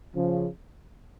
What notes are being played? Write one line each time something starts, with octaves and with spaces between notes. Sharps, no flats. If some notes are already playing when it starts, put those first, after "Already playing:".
C#3 F3